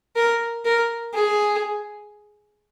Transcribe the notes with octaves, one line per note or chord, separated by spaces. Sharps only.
A#4
A#4
G#4